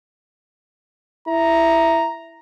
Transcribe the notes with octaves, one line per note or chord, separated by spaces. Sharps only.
E4 A#5